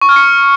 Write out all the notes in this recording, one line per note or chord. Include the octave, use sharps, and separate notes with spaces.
C#6
F6
C#7